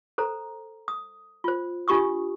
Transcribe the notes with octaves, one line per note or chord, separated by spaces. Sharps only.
A4 C5 A#5
D#6
F4 C5
D4 F4 G4 C#6 D#6